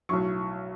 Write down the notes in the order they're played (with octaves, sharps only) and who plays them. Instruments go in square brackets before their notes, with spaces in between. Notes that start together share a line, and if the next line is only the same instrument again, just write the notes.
[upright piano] B1 A2 F#3 C#6